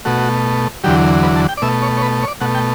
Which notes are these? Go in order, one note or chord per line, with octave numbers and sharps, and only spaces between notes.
B2 A3 F#4
E2 D3 F#3 G4
B4
A5
G5
D5
B2 A3 E5
C#5
C#5
B4
C#5
D5
B2 A3 F#5
G5